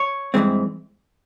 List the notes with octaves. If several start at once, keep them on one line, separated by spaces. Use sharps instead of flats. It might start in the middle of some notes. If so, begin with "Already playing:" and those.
Already playing: C#5
G2 E3 G#3 C4